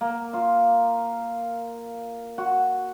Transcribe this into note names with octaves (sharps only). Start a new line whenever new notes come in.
A#3
F4
F#4